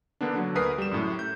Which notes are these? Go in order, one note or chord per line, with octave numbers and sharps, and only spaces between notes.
D3 A#3 B3 D4
D3 F#3
D2 A#4 B4 D#6 B6 C7
G3 E7
F#2 A2
G6